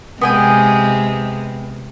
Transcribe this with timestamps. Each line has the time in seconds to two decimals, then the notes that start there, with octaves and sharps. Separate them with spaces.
0.21 C3 G#3 B3 G5 G#5